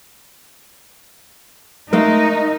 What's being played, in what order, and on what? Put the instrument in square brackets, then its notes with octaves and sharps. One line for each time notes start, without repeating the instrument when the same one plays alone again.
[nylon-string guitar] G#3 A3 F5 [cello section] D#4 [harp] A#4